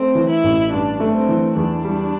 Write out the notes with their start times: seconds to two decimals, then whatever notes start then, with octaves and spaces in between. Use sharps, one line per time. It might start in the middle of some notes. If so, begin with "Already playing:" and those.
Already playing: A3 C4
0.15 E3
0.29 E4
0.44 A1
0.72 G2 D4
1.00 A3
1.14 C4
1.28 E3
1.56 E2 D4
1.85 G3